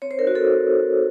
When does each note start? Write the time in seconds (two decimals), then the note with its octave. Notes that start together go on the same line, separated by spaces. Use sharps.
0.02 C4 C#5
0.11 C5
0.19 D#4 A#4
0.27 F#4
0.35 C4 A4